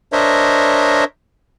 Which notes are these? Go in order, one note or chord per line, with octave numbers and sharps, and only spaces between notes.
D4 A#4 C5 C#5 D#5 E5